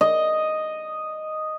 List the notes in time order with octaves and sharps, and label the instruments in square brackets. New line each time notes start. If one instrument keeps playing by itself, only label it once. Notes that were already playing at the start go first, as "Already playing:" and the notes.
[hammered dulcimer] D#5